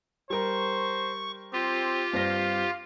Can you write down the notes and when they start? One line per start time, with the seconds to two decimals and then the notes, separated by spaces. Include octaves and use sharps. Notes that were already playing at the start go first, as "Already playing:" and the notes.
0.30 G3 A#4 C5 C#6
1.53 C4 F4 G4
2.13 G2 C4 F5 A#6